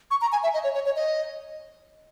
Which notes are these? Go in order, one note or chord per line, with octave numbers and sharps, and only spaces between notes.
C#6
A#5
G#5
E5
D#5
C#5
C#5
C#5
D#5